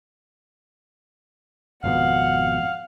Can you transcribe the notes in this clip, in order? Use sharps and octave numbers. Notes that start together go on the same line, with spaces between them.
G#1 F2 B2 F5 F#5